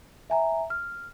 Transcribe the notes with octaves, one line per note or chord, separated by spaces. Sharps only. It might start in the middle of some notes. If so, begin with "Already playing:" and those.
E5 G#5 A#5
F6